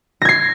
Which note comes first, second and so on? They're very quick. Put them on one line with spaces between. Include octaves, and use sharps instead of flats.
A#6 G#6 C7